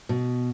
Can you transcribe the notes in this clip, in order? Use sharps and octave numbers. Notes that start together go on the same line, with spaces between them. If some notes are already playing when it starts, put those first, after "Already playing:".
B2